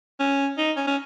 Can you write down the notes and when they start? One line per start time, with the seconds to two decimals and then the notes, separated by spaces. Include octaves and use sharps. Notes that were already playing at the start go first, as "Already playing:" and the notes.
0.20 C#4
0.58 D#4
0.76 C#4
0.87 C#4